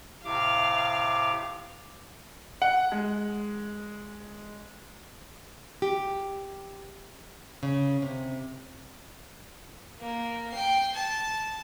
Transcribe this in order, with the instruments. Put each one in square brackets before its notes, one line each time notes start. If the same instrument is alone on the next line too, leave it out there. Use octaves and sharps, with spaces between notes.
[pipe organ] A2 C3 D6 [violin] F5
[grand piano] F#5
G#3
[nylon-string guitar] G4
C#3
C3
[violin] A#3
G5 C7
A5